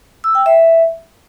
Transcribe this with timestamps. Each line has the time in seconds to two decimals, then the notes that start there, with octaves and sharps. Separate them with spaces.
0.24 E6
0.35 G5
0.46 E5